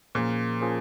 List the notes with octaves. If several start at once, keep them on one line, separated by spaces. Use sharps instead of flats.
A#2 F3 A#3 C#4 G#4 C5
F3 A#3 C#4 G#4 C5